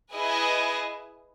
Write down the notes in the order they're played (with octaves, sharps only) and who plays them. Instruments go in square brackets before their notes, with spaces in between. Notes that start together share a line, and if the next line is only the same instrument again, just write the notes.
[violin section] E4 G#4 B4 D#5 G#5